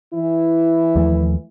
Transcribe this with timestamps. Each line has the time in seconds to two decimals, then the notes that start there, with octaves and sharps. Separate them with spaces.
0.13 E3 E4
0.96 D#2 F3 A3